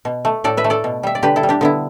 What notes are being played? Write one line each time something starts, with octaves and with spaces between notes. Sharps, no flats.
B2
A3
A2 A4 D5
B4 E5
A3
A4 D5
B2
G3 E5
D5
D3 G4 B4
E4 A4
G3
D4 G4
D3 B3 E4